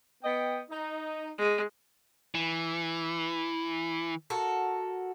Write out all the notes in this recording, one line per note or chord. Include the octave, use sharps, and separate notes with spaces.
B3 D#5 G5
D#4
G#3
E3
F#4 A4 A#4